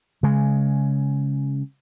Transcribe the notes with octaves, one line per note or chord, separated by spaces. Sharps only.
C#3 G#3